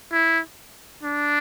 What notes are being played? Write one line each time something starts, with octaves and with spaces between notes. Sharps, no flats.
E4
D4